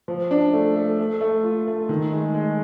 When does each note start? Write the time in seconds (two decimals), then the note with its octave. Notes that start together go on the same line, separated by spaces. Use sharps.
0.08 F3
0.31 D4
0.53 A3
0.76 A3
0.99 A3
1.21 A3
1.43 F4
1.67 A3
1.89 D#3
2.12 G#3
2.34 G#3